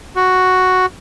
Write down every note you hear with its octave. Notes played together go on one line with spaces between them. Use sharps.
F#4